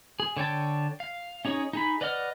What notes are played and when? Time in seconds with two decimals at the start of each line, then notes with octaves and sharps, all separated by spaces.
0.20 G#4
0.37 D3 C#5 G5 A5
1.00 F5
1.45 C#4 D#4 G#4 C#5
1.73 D#4 G#4 B5
2.01 B4 D5 D#5 F#5 F6